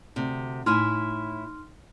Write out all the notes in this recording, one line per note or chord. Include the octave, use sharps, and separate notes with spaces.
D2 C3
A2 D#4 E4 G#5 C6 F6